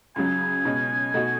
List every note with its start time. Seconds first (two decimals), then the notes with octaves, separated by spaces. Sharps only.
0.16 C#2 C#3 F#3 G#5
0.65 B2 G#3 C#4
1.14 B2 A3 D#4 F#4